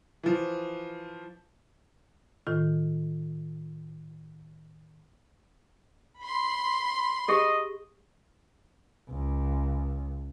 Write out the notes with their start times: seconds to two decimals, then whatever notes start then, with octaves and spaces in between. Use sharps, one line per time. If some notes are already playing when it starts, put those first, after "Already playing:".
0.23 E3 F3
2.47 A2 D#3 F4
6.21 B5 C6
7.28 G4 G#4 D#5
9.10 C#2